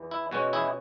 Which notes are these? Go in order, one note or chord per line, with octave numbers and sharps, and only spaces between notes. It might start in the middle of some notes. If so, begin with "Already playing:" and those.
Already playing: E2 E3 B3
E4
B2 G#3 C#4 F#4
E4 G#4